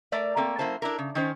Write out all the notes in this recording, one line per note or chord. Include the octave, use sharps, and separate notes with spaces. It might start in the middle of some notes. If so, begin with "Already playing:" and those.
A3 A#4 D5 E5
A3 A#3 C4
F#2 A#3 E4 C5 A5
D4 E4 A#4
C#3
D#3 C#4 C5